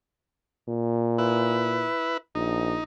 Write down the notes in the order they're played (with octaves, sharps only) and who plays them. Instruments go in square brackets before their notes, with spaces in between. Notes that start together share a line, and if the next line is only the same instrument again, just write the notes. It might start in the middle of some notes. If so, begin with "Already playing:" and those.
[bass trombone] A#2
[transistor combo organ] E4 B4
[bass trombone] A#1 [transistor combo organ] D#4